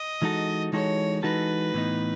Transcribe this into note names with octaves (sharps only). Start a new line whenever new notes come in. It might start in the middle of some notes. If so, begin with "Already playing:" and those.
Already playing: D#5
E3 G#3 D#4 F#4 A4
E3 G#3 D#4 F#4 A4 C#5
E3 G#3 D#4 F#4 A4 B4
A2 E3 B3 D#4